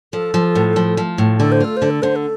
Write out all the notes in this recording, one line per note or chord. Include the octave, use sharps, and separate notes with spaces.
F3 A4
F3
A2
F3
F3
A2
D3 A4
C5
F4 A4
D3 C5
A4
D3 C5
A4